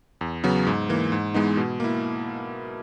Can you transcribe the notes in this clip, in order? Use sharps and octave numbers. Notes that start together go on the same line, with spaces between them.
E2
C#3 F#3 B3
G#2
E3 A#3
G#2
E3 G#3 B3 D#4
B2
A#3 E4